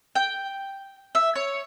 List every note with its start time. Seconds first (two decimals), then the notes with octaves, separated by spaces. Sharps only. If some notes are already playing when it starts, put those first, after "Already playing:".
0.15 G5
1.15 E5
1.35 C#5